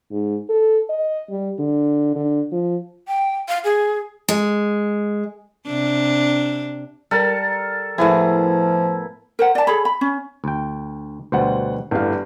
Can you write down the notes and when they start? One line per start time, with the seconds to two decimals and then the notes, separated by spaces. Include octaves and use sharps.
0.11 G#2
0.49 A4
0.89 D#5
1.30 G3
1.59 D3
2.16 D3
2.52 F3
3.08 G5
3.48 F5
3.64 G#4
4.29 G#3
5.67 C3 D4
7.11 G3 A4 A#4 A5
7.98 A2 F3 B3 E4 G#4
9.39 A#4 C5 F#5
9.55 D5 A5
9.67 G#4 A4 C#5 B5
9.85 B5
10.01 C#4
10.44 D2 G5
11.32 D2 B2 G3 C5 F#5
11.91 G1 A2 G3 F5